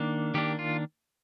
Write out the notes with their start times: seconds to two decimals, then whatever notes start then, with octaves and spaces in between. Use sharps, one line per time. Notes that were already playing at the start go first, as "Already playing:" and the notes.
Already playing: D#3 A#3 D4
0.34 D#3 A#3 D4 G4
0.59 F4